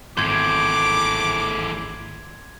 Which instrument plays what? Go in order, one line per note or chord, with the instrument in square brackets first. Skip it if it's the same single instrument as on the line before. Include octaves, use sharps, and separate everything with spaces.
[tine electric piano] G#1 G6 [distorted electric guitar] E2 A2 [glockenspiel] C6 G#6 [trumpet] D6